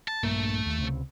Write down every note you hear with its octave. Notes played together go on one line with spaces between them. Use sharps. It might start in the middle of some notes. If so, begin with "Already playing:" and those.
A5
A#1 G2 A3 A#3
D#2
C#2 C3